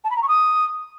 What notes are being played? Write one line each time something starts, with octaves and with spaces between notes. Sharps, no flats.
A5
B5
A#5
C#6
D#6